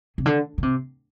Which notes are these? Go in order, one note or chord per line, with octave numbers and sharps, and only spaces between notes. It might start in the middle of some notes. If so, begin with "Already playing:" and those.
C3
D3
D3
C3